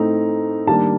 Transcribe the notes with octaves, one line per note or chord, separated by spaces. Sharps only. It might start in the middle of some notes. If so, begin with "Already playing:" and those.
Already playing: A2 A3 C4 D#4 A#5
D#3 G3 A#3 D4 A5